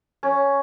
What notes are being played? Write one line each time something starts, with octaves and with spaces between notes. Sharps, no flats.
C#4